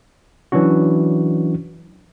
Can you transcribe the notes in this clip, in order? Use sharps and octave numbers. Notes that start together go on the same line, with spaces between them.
E3 F#3 C#4 D4 F#4